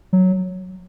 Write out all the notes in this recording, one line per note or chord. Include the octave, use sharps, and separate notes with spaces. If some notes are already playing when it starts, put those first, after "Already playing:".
F#3